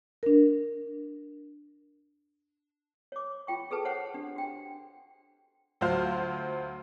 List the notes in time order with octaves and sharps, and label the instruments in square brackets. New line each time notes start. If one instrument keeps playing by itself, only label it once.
[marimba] D4 A#4
[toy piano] C#5 D6
F4 G5 C#6
G#4 A4 B4 A5
C5 C#5 F#5 G5
D4 G4
F#4 G5 G#5
[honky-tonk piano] D2 F#3 F4 C5 F5 F6